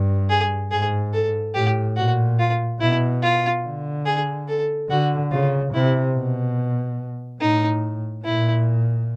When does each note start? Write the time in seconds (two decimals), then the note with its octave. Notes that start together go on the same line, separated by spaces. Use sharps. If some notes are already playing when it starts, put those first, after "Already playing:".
Already playing: G2
0.30 G#4
0.71 G#2 G#4
1.13 A4
1.55 A2 G4
1.97 A#2 F#4
2.39 F4
2.80 B2 E4
3.22 F4
3.64 D3
4.06 G#4
4.48 A4
4.89 D3 F#4
5.32 C#3 F4
5.74 C3 E4
6.15 B2
7.41 A2 D#4
8.25 A#2 E4